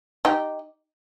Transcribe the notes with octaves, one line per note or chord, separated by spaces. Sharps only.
D#4 G4